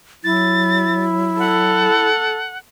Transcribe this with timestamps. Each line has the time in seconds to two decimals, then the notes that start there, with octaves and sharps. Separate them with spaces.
0.24 F#3 E4 A6
1.39 A4 F#5